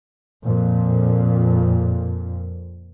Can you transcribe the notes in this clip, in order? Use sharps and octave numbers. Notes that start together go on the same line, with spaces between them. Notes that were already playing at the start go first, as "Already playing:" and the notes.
F2 A#2